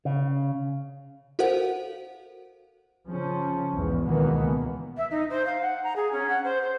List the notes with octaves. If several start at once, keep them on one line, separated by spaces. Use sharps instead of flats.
C#3
F#4 A4 A#4 C5 F5 F#5
C#3 F3 C#4
B1 E2 G#2
C#2 B2 D#3 E3 A#3 B3
E5
D#4
C5
F5
F#5
A#5
G#4
C#4
F#5
C5
C5